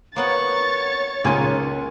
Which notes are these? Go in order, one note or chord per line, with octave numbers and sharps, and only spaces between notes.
A#3 B3 C#5 F#5 C#6 A6
C#2 A#3 D#4 G#5 C6